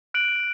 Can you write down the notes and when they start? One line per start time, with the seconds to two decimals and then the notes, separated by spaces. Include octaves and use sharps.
0.14 F#6 D7 F#7